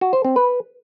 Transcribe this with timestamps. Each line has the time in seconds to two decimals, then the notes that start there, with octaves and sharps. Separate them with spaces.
0.01 F#4
0.13 C5
0.25 C4
0.36 B4